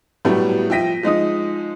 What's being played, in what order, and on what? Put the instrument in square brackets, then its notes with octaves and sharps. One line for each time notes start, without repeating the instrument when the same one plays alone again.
[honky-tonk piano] A2 F#3 G3 A3 B3
F3 E5 G5 A#6 B6 D#7
F3 G#3 D#4 D#6